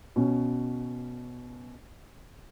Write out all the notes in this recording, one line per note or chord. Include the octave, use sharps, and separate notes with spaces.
B2 C#4